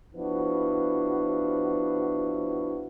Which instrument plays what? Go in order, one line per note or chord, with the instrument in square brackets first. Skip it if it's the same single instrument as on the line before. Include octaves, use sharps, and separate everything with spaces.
[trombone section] F3 B3 D4 E4 F#4